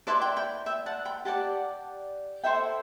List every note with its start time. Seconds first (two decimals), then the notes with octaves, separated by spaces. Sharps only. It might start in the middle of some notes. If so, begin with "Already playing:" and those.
0.07 E4 B4 D5 A5 C6
0.22 G5 B5
0.36 G5 B5
0.66 E5 G5
0.86 F#5 A5
1.05 G5 B5
1.25 G4 D5 F#5 A5
2.44 E4 A4 C5 E5 G5